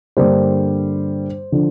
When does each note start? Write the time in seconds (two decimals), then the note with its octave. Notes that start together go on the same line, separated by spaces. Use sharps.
0.17 G2 D3 G3 A#3 C5
1.52 D3 F3